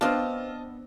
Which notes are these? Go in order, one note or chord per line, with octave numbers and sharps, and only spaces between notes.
B3 C4 D4 F4 D#5 A5 F6